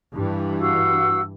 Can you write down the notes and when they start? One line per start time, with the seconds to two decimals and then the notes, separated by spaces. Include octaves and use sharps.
0.15 G2 E3
0.60 F#4 F5 E6